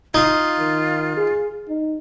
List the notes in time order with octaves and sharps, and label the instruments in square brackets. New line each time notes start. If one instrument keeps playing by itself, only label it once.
[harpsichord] D#4 [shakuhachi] F4
[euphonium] D#3
G#4
D#4